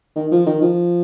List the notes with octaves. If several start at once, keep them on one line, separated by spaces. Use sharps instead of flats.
D#3
F3
D#3
F3